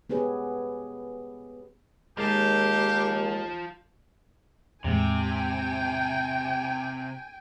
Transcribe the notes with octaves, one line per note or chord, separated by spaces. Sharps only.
B3 G4 G#4 B4 C#5
D#2 G#3 F4 G4 A5
E2 A2 C3 G#3 G5 G#5